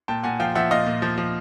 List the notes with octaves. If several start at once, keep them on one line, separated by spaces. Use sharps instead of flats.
A#2 G5 A5
A#2 F#5 G#5
F3 F5 G5
F3 E5 F#5
A#2 D#5 F5
A#2
F3
F3